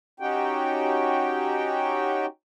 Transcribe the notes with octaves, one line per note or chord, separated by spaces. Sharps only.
C#4 D#4 F#4 G4 G5